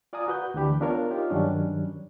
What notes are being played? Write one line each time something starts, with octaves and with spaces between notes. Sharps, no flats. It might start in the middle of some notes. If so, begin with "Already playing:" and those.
F4 D5 F5 G#5 A#5 D#6
F#4 B4 G6
D2 E3 D4 G4 B5
B3 D4 F4 A#4 C#5
D#4 F4 G4 C#5
G2 D#3 F#3 G3 C#4 D4